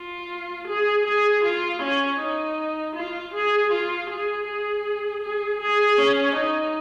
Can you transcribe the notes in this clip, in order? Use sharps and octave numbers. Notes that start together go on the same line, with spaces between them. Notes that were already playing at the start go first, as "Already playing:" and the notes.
Already playing: F4
G#4
G#4
F4
C#4
D#4
F4
G#4
F4
G#4
G#4
G#4
G#4
C#4
D#4